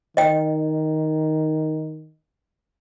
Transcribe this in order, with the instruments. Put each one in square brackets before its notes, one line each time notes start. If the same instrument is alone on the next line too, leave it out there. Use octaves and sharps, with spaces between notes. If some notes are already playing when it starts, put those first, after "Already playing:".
[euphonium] D#3 [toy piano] D#5 G5